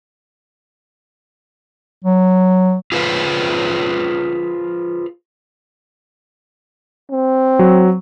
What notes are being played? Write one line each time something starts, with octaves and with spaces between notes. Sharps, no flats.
F#3
F4 G#4 B4 C5 F5
C4
F#3